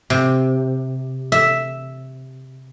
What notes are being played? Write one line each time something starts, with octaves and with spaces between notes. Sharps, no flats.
C3
E5